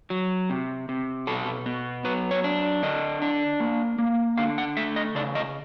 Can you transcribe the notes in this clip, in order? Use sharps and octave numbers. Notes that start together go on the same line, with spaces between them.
F#3
C3
C3
B2 A4
B3
F#3 B4
C#5
D4
D3 D#5
D4
A#3
A#3
D3 F5
F#5
A3 E5
D#5
C#3 D5
D#5